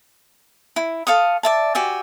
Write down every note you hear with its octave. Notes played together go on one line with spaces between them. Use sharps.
E4
A4 F5 C#6 D#6
D5 E5 A5
F#4 G4 E5 G#5